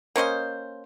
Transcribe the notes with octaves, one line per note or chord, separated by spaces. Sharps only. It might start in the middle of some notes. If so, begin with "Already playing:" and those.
A#3 C#4 C5 D#5